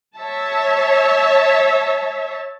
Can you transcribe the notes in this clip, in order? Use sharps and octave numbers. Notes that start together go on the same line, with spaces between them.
C#5 E5 A5